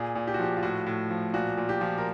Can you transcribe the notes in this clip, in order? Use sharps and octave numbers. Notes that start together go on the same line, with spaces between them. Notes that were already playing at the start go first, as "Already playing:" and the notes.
Already playing: A#2 G#4
A#2
G4
F#4
F3 G4
F4
A2 F#4
A2
F3
A#2 F#4
A#2
G4
F3
A#4